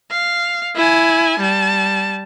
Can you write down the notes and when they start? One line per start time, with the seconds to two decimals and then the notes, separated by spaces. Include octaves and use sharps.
0.11 F5
0.75 E4 G#5
1.39 G3 A5